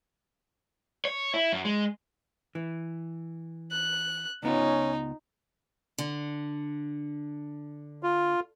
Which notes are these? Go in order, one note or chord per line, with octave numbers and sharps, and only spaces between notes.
C#5
E4
F#2
G#3
E3
F#6
C#2 B3 C#4 D#4 F4
D3
F4